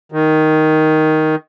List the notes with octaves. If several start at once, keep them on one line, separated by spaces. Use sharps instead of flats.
D#3